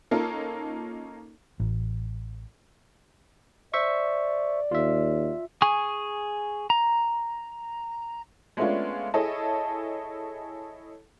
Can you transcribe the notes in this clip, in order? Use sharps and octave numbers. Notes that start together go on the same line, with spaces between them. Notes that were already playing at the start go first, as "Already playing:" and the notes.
A#3 C#4 D#4 F4 A4 A#4
A1
C5 D5 E5 C#6
D#2 F4 E5
G#4 G#5 C#6 D#6
A#5
G#3 A3 B3 C#4 D4 F4
E4 G#4 A4 C#5 D#5 A5